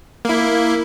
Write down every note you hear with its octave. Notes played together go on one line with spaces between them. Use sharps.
A#3 E4